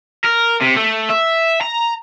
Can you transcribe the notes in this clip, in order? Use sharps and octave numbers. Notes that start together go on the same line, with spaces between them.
A#4
C3
A3
E5
A#5